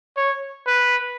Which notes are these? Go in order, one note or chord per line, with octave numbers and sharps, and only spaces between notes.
C#5
B4